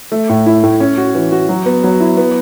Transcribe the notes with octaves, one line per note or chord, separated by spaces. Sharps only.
A3
A2
E4
A2
C#4
F#4
E3
F#4
F#3
B3
F#3
E4
B3